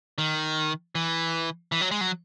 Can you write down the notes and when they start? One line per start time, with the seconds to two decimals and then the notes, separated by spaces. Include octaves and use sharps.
0.18 D#3
0.95 E3
1.72 E3
1.81 F#3
1.91 G#3
2.01 F#3